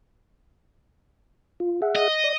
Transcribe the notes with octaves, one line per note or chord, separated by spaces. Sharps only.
F4
G#4 E5 F#5
D#5
D5